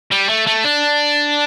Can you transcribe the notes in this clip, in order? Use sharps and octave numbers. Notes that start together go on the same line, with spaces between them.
G3
A3
A3
D4